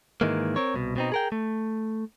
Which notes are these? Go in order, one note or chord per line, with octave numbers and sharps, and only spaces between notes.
G#2 D#3 E3 G#3 A#3
C4 A#4 C#5
C2 B2
B2 C4 D#4
G#4 A#4 G5
A3